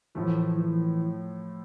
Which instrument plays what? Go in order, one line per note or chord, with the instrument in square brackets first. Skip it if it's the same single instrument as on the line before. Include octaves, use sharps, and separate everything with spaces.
[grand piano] A2 F3 A3 [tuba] E3
[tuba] E3